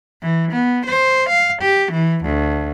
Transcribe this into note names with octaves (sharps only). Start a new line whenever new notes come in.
E3
B3
C5
F5
G4
E3
D2